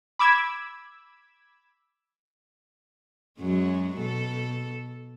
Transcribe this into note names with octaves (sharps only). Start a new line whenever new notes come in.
B5 D6 E6 G#6
F#2 F#3 G#3
B2 A4